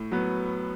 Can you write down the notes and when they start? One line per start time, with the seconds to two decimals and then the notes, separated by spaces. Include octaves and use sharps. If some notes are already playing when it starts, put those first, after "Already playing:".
Already playing: A2
0.12 F#3 B3